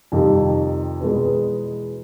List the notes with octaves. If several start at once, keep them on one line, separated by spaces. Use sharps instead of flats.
F2 C3 D#3 G3
E2 B2 G#3 B3